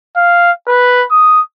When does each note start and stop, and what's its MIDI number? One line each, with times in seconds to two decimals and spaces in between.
0.16 0.52 77
0.68 1.05 71
1.11 1.41 87